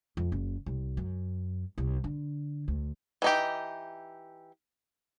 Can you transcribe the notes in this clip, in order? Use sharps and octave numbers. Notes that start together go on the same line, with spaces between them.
F2
F#1
C2
F#2
C2
D3
D2
E3 D#4 G4